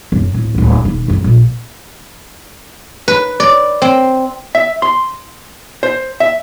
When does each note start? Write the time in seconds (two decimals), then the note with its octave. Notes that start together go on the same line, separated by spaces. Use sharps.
0.12 F#2 C4
0.34 D1
0.54 D1 D2
0.83 E1 D#3
1.08 F#1 F2
1.24 A#1
3.08 B4
3.40 D5
3.82 C4
4.55 E5
4.82 C6
5.83 C5
6.20 E5